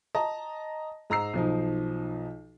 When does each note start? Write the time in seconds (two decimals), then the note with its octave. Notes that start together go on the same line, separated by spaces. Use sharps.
0.15 D#5 A5 A#5
1.10 G#2 A#5 E6 C7
1.33 B1 F3 D#4